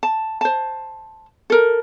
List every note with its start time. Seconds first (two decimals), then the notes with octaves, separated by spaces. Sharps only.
0.03 A5
0.41 C5 A5
1.50 A4 A#4